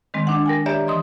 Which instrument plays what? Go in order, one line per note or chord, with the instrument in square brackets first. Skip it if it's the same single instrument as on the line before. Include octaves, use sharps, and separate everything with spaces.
[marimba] D#3 G#3 C4
D4 F#5
A#4 G5 G#5
G4 C#5 D5 E5 A#5
E3 D#5 C6 D#6